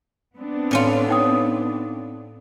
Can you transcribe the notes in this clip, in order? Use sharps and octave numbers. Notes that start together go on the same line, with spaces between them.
B3 C4 D4
A2 C#4 F4
D#4 G5 D#6